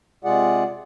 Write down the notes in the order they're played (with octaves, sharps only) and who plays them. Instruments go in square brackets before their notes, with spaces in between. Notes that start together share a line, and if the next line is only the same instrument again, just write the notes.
[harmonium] C3 G#3 F4 G#4 D5 F#5